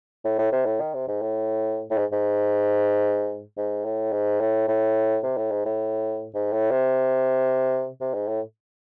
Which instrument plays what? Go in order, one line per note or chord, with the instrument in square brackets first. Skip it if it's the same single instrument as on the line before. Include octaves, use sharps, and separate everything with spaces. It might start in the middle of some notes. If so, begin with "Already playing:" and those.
[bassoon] A2
A2
C3
A2
D#3
C3
G#2
A2
A2
G#2
G#2
G#2
A2
G#2
A2
A2
C3
A2
G#2
A2
G#2
A2
C3
C3
G#2
A2